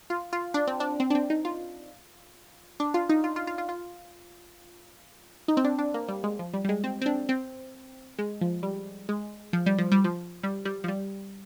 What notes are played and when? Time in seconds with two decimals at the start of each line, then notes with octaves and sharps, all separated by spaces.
0.10 F4
0.33 F4
0.54 D4
0.67 C4
0.80 D4
1.00 C4
1.10 D4
1.15 C4
1.30 D#4
1.45 F4
2.80 D4
2.94 F4
3.09 D#4
3.24 F4
3.36 F4
3.47 F4
3.58 F4
3.69 F4
5.48 D#4
5.57 C4
5.64 D4
5.79 D4
5.94 A#3
6.08 G3
6.24 G#3
6.39 F3
6.53 G3
6.64 G3
6.69 G#3
6.84 C4
7.01 C4
7.06 D4
7.29 C4
8.18 G#3
8.41 F3
8.63 G3
9.09 G#3
9.53 F3
9.66 G3
9.78 F3
9.92 G3
10.04 F3
10.43 G3
10.65 G3
10.84 F3
10.88 G3